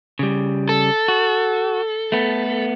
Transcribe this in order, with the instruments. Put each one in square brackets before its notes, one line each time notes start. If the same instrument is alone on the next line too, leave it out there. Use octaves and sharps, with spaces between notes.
[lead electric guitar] C#3 G3
[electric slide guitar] A4
[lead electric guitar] F#4
A3 B3